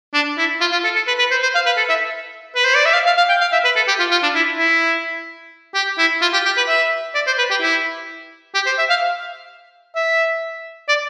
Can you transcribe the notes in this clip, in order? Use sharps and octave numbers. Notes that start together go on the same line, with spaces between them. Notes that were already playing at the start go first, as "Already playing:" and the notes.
D4
E4
F4
F4
A4
A4
B4
B4
C5
C5
F5
B4
A4
E5
B4
C5
D5
E5
F5
F5
F5
G5
F5
E5
B4
A4
G4
F4
F4
D4
E4
E4
G4
E4
F4
G4
G4
B4
E5
D5
C5
B4
G4
E4
G4
C5
E5
F5
E5
D5